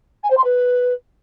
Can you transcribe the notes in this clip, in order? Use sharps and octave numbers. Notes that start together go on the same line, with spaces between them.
G#5
C5
C6
B4